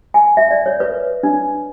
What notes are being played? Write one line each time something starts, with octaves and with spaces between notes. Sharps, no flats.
G#5
E5
D5
C#5
B4
D4